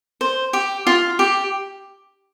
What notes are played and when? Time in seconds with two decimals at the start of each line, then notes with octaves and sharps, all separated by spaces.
0.21 C5
0.53 G4
0.87 F4
1.19 G4